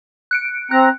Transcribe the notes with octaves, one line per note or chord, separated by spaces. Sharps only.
F#6 C#7 D7
C4 A#5 F#6